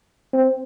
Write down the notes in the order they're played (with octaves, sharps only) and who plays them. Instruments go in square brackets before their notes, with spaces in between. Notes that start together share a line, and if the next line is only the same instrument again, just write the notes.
[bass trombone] C4